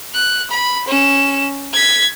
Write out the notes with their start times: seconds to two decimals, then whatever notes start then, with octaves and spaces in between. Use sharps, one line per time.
0.14 F#6
0.50 B5
0.88 C#4 E7
1.73 G#6 B6